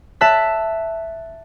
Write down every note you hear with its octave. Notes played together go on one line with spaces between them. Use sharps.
E5 A5 F#6 B6